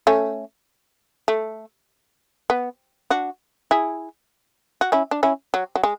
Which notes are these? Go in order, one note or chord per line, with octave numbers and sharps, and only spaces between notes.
A3 C#4
A3
B3
D4 F#4
E4 G#4
F#4
C#4 E4
D4
C#4 E4
F#3
F#3
G#3